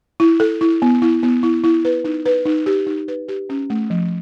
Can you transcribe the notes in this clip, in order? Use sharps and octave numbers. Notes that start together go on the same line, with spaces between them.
E4
A4
E4
B3
E4
B3
E4
E4
B4
D#4
B4
D#4
G4
D#4
B4
G4
C#4
A3
F3